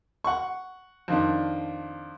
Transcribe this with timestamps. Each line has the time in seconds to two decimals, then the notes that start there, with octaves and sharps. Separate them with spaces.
0.24 F#5 C#6
1.08 F2 D#3 D4